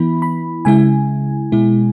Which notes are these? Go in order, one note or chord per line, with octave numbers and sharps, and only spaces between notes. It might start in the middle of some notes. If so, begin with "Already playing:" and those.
Already playing: E3 B3 E4 B5
B5
C#3 G#3 E4 G#5
B2 G#3 E4